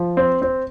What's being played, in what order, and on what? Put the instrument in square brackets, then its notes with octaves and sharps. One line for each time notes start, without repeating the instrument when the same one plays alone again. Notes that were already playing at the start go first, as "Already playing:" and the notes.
Already playing: [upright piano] F3
C4
C4